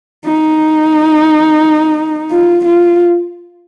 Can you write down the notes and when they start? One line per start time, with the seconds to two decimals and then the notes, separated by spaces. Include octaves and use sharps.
0.25 D#4
2.31 F4
2.65 F4